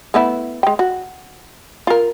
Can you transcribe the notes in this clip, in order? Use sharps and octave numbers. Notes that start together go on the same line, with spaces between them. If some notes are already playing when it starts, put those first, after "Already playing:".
A3 B3 E4
G#3 G5
F#4
F4 A#4